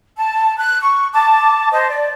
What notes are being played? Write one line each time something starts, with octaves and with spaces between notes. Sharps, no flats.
A5
F#6
C#6
A5 D6
C5 D#5 A5
D5